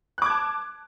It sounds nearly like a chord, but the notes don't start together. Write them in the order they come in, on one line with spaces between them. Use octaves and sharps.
F#6 D6 G#6 A5